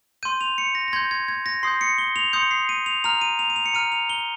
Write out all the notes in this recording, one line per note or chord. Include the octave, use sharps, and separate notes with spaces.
C6 G6 D#7
F7
C#7
A#6
A#6
C6 G6 G#6
G#6
G#6
A#6
C6 D#6 G6 C7
C#7
G7
F7
C6 D#6 G6 C#7
C7
D#7
F7
A#5 F6 F7
D#7
F7
D#7
F7
C#7
A#5 F6 D#7
F7
G7